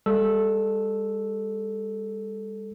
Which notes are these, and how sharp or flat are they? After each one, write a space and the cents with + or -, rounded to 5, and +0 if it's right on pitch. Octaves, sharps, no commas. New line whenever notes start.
G3 +40 A4 +0 E6 +0